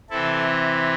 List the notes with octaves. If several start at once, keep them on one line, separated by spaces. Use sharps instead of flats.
C3 E3 C4 E4 A4